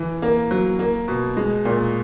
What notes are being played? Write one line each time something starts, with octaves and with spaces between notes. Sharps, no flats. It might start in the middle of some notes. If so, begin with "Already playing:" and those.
Already playing: E3
A#3
F#3
A#3
B2
G#3
A#2